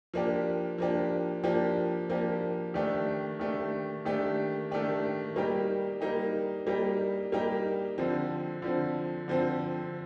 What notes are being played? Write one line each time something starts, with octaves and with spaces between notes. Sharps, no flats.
F3 A#3 D4 G4
F3 A#3 D4 G4
F3 A#3 D4 G4
F3 A#3 D4 G4
D#3 A3 D4 G4
D#3 A3 D4 G4
D#3 A3 D4 G4
D#3 A3 D4 G4
G3 A#3 D#4 G4
G3 A#3 D#4 G4
G3 A#3 D#4 G4
G3 A#3 D#4 G4
D3 F3 C4
D3 F3 C4
D3 F3 C4